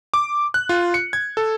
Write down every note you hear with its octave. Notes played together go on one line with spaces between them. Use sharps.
D6
F#6
F4
C#7
G#6
A4